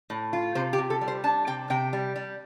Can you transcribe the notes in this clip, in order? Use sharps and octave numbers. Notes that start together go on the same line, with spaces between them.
A2
F4
C3 C5
G4
C3
A4
G3
C5
D4 A5
C3 G5
C3 G5
G3
G3